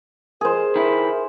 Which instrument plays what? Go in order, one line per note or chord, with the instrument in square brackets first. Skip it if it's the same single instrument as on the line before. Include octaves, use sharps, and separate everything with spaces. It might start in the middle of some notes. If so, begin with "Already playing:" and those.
[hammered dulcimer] G#4 C5 [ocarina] A#4
[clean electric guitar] D#3 E4